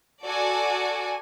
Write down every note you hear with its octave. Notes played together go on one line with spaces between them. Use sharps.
F#4 A4 D5 G#5